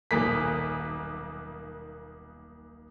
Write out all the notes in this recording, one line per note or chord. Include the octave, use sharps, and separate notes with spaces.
D#1 B1 A#3 B6